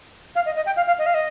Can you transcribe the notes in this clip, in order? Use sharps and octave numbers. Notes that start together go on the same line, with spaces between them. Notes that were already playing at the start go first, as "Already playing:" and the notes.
F5
D#5
D#5
G5
F5
F5
D#5
F5
D#5